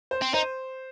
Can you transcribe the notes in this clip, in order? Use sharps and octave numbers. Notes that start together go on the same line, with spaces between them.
C5
C4
D#4 C5